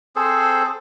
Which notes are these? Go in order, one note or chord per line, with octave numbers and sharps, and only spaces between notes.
C4 G#4 A4 C5